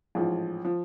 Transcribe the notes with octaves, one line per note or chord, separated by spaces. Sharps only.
A1 G#2 F3
F3